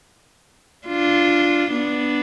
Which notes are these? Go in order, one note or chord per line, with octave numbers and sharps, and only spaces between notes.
D4 F4
B3 D4